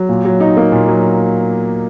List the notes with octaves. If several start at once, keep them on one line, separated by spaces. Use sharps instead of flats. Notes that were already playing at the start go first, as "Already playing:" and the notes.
Already playing: F#3
A#2
F#3
D#4
A#3
A#2
F#3